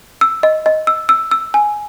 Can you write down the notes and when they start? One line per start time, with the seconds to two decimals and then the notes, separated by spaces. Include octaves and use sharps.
0.21 E6
0.43 D#5
0.66 D#5
0.87 E6
1.09 E6
1.31 E6
1.54 G#5